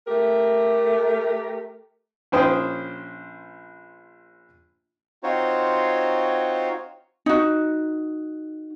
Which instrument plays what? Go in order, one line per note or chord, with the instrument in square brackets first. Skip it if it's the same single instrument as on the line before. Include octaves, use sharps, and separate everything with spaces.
[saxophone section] A3 G4 A#4
[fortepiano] A#1 C#4 C5 G5 C6 D#6
[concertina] C4 D#4 F4 F#4 C5 C#5
[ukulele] D#4 F#4